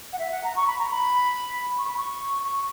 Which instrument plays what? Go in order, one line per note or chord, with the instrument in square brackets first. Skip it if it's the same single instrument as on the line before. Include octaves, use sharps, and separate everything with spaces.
[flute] F#5
E5
F#5
A#5
C#6
B5
A#5
B5
C#6
B5
C#6
C#6